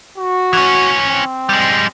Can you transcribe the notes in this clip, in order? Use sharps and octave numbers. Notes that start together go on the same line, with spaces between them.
F#4
E3 C#4
C4
G3 G#3